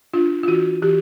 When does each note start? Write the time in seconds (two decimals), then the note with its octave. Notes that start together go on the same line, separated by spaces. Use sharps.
0.13 D4 F4
0.43 F4
0.47 E3 F#4
0.82 E3 G4